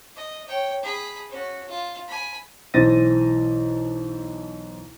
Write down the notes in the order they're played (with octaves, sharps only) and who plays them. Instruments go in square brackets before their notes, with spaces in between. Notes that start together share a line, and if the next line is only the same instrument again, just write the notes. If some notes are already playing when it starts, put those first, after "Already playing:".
[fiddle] D#5
C#5 G5
G#4 B5
C#4 F#4
F4
G#5 B5
[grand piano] B1 E3 C5 A6 A#6 D#7